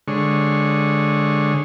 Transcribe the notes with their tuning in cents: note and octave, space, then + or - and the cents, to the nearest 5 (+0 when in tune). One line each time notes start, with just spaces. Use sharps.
D3 +0 G#3 +0 C#5 -10